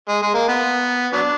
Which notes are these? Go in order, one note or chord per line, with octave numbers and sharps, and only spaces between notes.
G#3
G#3
A#3
B3
F#3 B3 D4